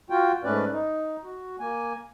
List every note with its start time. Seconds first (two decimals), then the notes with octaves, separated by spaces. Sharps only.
0.10 F4 F#4 G5
0.44 G#2 A3 C#4 B4 D5
0.71 D#4
1.24 F#4
1.59 A#3 G#5